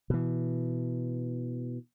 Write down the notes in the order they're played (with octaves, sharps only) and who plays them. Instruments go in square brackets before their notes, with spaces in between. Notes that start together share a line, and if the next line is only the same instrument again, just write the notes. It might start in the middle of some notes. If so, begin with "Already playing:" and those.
[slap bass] B2 E3